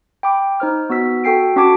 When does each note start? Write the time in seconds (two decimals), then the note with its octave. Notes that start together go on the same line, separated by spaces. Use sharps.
0.23 G5 B5 D6
0.60 D#4 C5 F6
0.90 B3 F#4 E6 B6
1.24 F#4 A4 G5 C7 D7
1.56 C#4 F#4 A5 D6 G#6 D7